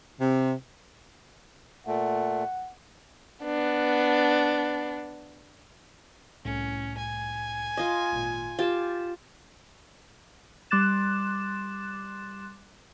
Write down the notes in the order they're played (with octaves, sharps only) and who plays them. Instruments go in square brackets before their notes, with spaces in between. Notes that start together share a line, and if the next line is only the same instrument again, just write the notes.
[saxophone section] C3
[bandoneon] A#2 A3 [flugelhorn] F#5
[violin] B3 D4
[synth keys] C2 A2 [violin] C#4
[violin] G#5
[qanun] F4 D#5
[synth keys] G#1 A#2
[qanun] F4 G4 [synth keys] A6 E7
[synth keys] G3 C6 D6 F#6 A6 E7